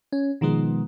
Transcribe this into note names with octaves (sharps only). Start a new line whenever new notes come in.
C#4
B2 D#3 F3 G#3 B3